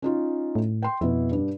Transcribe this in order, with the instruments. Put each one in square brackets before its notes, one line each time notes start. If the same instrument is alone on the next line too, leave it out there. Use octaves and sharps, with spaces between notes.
[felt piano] C#4 D#4 F4
[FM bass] A2
[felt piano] G5 C6
[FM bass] F2 [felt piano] B2 E4
[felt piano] G2 D4